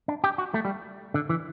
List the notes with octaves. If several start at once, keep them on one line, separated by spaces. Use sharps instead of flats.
D4
G4
F#4
A3
G3
D3
E3